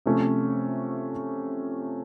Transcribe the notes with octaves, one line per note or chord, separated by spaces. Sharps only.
C3 F3 A3 C#4